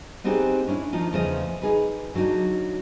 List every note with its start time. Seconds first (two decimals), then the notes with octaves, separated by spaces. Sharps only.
0.24 B3 C4 D4 D#4 G4 G#4
0.68 C#4 D4 E4
0.93 D#3 F3 D4 D#4 F4
1.13 E2 C#3 F3 A3 F4 D#5
1.62 D#4 G#4 B4
2.14 D3 F#3 G3 D4 D#4